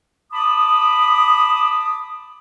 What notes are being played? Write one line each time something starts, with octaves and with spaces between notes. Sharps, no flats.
A5 B5 D6 D#6